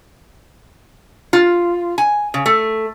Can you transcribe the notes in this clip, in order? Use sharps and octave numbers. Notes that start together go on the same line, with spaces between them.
F4
G#5
C#3
A3